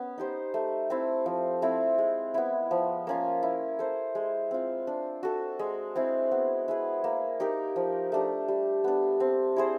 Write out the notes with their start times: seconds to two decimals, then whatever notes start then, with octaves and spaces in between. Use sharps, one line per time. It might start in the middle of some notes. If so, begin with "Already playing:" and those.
Already playing: B3 C#4
0.18 D#4 G4 C5
0.54 A3
0.90 C4 E4
1.26 F3
1.62 A3 C4 E4
1.98 G#3
2.34 B3 E4
2.71 F3
3.07 A#3 C#4 F4
3.43 E4
3.79 A4 C5
4.15 G#3
4.51 C4 F4
4.87 D4
5.23 F#4 A4
5.59 G#3
5.96 C4 E4 G#4
6.31 B3
6.68 E4 G#4 B4
7.04 A#3
7.40 D#4 G4 A#4
7.76 F3
8.12 A3 D4 G4
8.48 G3
8.84 B3 D4
9.20 C4
9.56 E4 G#4 C5